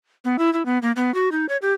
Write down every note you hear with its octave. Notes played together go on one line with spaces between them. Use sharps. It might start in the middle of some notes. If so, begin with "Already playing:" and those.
B3
E4
E4
B3
A#3
B3
F#4
D#4
C#5
G4